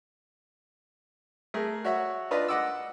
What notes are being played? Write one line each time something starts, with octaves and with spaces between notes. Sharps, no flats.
A3 G#4 A#4
F#4 C#5 E5 F#5
D4 F4 B4 D5 D#5
D#5 F#5 D6 E6